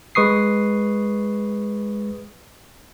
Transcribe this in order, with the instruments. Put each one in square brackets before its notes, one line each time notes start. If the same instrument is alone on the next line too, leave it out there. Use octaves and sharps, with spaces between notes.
[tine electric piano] G#3 B4 C#6 D#6 C7